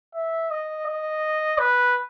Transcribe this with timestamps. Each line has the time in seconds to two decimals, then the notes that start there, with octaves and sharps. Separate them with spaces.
0.15 E5
0.51 D#5
0.86 D#5
1.59 B4